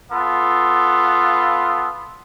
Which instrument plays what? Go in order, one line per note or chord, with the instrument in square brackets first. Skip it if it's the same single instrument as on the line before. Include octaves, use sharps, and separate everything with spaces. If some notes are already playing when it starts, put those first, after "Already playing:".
[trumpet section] B3 F4 A4